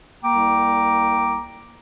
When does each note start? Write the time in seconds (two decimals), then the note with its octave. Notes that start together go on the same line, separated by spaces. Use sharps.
0.24 C2 A#3 G5 A#5 D6